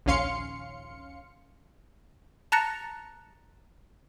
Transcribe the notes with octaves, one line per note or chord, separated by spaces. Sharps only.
A#1 D#2 C#4 F5 C6 C#7
A5 A#5 F#6 A6 A#6 C#7